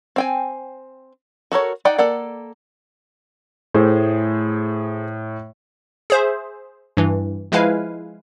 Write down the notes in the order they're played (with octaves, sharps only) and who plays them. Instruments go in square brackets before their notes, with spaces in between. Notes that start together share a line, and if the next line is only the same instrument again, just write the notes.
[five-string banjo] C4 G5 G#5
F#4 A4 A#4 C#5
D#4 D5 F#5 G5
A#3 A4 D5 F#5
[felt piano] A2 [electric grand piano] A3 G#4 C5
[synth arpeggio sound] G#4 C5 E5
G2 E3
F3 G#3 E4 B4 F5 G#5